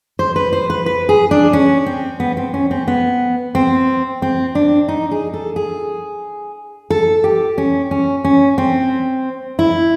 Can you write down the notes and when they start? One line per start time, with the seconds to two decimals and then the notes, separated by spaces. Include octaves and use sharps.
0.19 C5
0.36 B4
0.53 C5
0.70 B4
0.86 B4
1.09 G#4
1.31 D4
1.53 C#4
1.86 C4
2.20 B3
2.37 C4
2.54 C#4
2.71 C4
2.88 B3
3.55 C4
4.22 C4
4.55 D4
4.88 D#4
5.11 G#4
5.34 A4
5.56 G#4
6.90 A4
7.24 G4
7.58 C#4
7.91 C#4
8.24 C#4
8.58 C4
9.59 E4